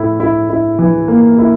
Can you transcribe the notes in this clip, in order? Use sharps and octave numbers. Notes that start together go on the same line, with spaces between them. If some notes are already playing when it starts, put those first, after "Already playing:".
Already playing: A2 E4
E4
E4
E3
A#3
E4